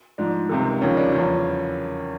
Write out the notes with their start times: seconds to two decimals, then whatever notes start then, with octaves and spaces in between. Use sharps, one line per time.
0.18 G#2 F3 D4
0.49 C#2 C3 D#3
0.81 D#2 C#3 F3 C#4
0.97 D4
1.12 E2 C#3 F3 C#4